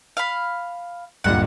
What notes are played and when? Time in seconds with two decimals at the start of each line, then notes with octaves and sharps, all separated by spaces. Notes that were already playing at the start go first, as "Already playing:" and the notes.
0.17 F5 B5
1.24 D1 G2 A#2 F#5